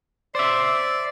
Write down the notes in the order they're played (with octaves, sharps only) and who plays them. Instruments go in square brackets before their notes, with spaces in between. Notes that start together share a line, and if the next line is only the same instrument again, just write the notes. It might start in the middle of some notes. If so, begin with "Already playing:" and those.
[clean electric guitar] C5 E5 [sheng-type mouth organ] D5